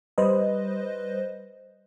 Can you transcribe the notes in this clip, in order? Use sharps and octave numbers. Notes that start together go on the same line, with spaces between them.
G3 B4 C5 D#5